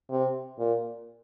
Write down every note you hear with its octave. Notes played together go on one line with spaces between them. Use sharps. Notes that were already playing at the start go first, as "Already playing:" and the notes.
C3
A#2